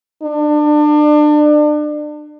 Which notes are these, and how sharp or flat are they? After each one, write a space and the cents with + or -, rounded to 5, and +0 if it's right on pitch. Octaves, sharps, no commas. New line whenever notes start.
D4 +30